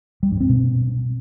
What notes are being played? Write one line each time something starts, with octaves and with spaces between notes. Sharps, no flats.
G3
G2
C4
B2